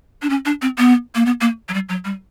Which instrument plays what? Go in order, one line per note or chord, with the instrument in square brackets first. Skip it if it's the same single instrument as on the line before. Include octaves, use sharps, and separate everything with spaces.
[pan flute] D4
C#4
D4
C4
B3
A#3
B3
A#3
F#3
G3
F#3
G3